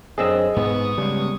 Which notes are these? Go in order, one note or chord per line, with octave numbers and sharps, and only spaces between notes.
F#2 C4 D4 G#4 D#5 E6
G#2 B3 C#6 D#6
C#3 G3 G#3